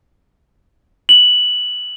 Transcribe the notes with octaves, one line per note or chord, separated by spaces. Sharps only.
F#7